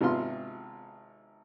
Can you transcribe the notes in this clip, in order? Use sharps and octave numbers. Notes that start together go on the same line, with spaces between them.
G#1 C3 B3 F4 C6